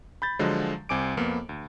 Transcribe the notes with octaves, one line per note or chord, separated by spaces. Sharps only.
B5 G6 A6
D3 F3 F#3 G#3
C2 C4 G#5 D6 D7
F2 A#3 B3
D2